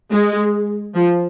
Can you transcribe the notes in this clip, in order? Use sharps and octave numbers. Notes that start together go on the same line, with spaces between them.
G#3
F3